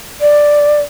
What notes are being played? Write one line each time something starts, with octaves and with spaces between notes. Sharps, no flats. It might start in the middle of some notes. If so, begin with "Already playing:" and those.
D5